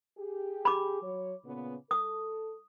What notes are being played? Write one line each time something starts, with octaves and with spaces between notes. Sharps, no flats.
G4 G#4
B5 D6
F#3 C#5
A#2 C#3 B3
A4 D#6